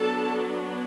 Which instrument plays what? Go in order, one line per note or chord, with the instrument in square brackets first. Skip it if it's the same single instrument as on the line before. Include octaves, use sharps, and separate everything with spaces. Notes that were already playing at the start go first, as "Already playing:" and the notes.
Already playing: [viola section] F#3 B3 D4 A4 A5